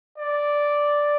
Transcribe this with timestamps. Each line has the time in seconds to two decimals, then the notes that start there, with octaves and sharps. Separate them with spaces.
0.18 D5